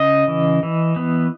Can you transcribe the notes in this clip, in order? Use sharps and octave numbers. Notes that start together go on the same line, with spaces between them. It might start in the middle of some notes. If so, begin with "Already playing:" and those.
Already playing: C#3 D#5
E3
E3
B3